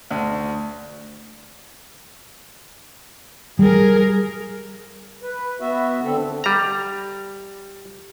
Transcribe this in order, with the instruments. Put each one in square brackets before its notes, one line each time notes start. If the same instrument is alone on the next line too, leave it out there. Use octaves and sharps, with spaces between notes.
[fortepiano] D2
[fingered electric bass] G3 [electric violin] G#4 A#4
[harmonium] B4
B3 F#4 E5
D3 C4 A4
[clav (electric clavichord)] G3 A#5